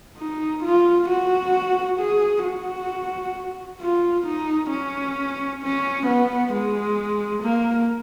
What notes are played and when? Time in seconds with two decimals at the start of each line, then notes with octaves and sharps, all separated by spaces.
0.18 D#4
0.64 F4
1.08 F#4
1.99 G#4
2.44 F#4
3.81 F4
4.26 D#4
4.71 C#4
5.62 C#4
6.07 B3
6.53 G#3
7.43 A#3